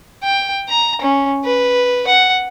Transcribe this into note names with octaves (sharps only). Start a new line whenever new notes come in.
G5
A#5
C#4
B4
F#5